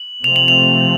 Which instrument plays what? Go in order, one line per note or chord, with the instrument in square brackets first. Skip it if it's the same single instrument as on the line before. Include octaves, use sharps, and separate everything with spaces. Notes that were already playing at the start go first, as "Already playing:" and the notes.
Already playing: [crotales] F#7
[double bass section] C3 F3 A3 C4 [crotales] F7
[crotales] F#7
F7